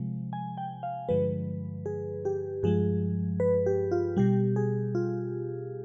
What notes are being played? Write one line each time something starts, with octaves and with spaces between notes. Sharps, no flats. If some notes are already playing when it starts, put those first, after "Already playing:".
Already playing: C3 F3 G#3
G#5
G5
F5
G2 D3 F3 G#3 B4
G#4
G4
G2 F3 G#3 G#4
B4
G4
F4
B2 G3 G4
G#4
F4